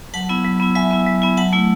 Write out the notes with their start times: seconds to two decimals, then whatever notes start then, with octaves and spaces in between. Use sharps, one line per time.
0.14 F#3 F#5 A5
0.29 B3 E4
0.44 F#3
0.60 B3 E4
0.75 F#3 E5 G#5
0.91 B3 E4
1.07 F#3
1.22 B3 E4
1.37 F#3 F#5 A5
1.53 A3 E4